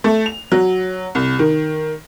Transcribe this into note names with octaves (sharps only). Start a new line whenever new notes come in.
A3
F7
F#3
C2
D#3